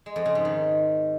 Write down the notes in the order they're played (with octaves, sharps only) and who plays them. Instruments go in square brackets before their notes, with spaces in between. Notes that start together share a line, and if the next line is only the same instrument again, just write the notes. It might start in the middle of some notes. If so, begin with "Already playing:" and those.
[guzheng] G#3
F2
C#3
G#2
D#3